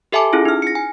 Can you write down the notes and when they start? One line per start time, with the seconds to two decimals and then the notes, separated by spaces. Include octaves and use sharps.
0.12 G4 A4 E5 G#5 A5 D6
0.33 C#4 E4 F4 G#4
0.45 D#4 F6
0.62 A#6 C#7
0.75 G#5